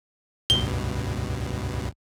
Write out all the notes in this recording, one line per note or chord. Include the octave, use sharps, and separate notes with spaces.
C#2 G2 B2 G7